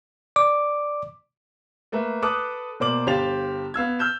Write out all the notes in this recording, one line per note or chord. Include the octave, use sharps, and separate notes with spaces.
D5 D6
A3 A#3 B4 E5
A4 B4 D6 D#6 F#6
B2 A#3 C5 D5 D6 F#7
G1 G4 C5 F5 A6 F7
B3 F5 E6 G#6
E6 F6 G6 E7